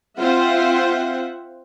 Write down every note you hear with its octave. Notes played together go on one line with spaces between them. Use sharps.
C4 F4 C5 E5 F#5